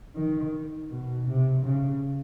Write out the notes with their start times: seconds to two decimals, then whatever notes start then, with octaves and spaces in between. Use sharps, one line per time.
0.16 D#3
0.90 B2
1.28 C3
1.66 C#3